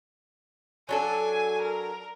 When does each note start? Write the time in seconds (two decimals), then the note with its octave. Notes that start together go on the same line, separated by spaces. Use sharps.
0.89 F#3 D4 A4 G#5
1.61 A#4